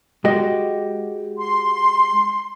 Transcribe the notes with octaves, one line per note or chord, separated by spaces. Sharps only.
G#3 F#4 G4 D#5
C6